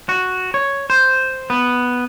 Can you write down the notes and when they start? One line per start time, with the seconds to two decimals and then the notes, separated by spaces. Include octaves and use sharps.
0.09 F#4
0.54 C#5
0.90 C5
1.50 B3